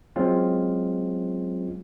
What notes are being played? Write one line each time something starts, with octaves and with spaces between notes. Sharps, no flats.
F#3 G#3 C4 C#4 F4